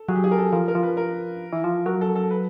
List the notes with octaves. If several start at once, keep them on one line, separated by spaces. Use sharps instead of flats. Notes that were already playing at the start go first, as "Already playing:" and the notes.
Already playing: A4
F#3 G#4
G4
G#4
A#4
A4
F3 A#4
A#4
F3
B4
A#4
E3
F3
F#3 A#4
A4
A4
B4